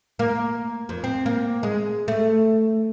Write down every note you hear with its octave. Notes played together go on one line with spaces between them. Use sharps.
A#3
F2
C4
A#3
G#3
A3